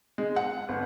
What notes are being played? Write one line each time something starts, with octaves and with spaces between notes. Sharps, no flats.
G#3
F#5
G1